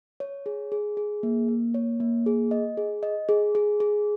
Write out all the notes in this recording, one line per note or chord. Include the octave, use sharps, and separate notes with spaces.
C#5
G#4
G#4
G#4
A#3
A#3
C#5
A#3
G#4
D#5
G#4
D#5
G#4
G#4
G#4